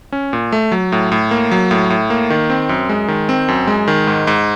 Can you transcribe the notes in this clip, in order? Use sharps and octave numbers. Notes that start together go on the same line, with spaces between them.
C#4
A#2
A3
F#3
A2
A2
A#3
F#3
A2
A2
A#3
D#3
C4
F#2
G#3
D#3
C4
F#2
G#3
D#3
G#2
G#2